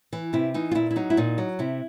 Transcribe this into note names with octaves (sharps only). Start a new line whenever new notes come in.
E3
C3 E4
E3 D#4
F4
A#2 E4
E4
F#3 D#4
E4
A#2 D#4
F#3
C3 E4